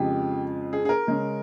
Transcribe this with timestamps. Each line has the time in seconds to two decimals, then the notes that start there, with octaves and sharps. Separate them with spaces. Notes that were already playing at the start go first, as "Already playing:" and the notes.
Already playing: F2 C#3 F3 G#3 G4
0.73 G#4
0.85 G#4
0.89 A#4
1.07 C#3 G#3 C#4